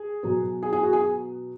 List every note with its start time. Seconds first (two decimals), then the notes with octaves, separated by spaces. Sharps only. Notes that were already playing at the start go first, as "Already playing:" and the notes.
Already playing: G#4
0.23 B2 F#3 B3
0.63 G#4
0.73 G#4
0.83 F#4
0.93 G#4